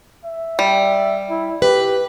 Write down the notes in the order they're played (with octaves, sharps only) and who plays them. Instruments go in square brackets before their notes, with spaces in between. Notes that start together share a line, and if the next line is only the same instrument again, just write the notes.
[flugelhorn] E5
[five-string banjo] G3
[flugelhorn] E4
[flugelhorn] G4 [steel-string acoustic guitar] B4